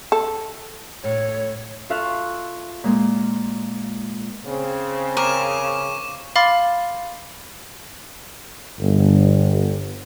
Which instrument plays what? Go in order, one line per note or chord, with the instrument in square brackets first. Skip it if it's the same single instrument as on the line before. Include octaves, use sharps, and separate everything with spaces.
[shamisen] A4
[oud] A2 [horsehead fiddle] C#5
[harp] F4 A4 E5 F5 C#6 F#6
A#2 G#3 A#3
[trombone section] C#3 [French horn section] C4
[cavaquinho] A#4 [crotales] C#6 D6 E7
[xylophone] F5 B5 C6 D6 F6 A6
[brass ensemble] G1